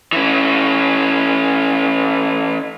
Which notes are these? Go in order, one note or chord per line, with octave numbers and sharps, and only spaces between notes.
E3 C#4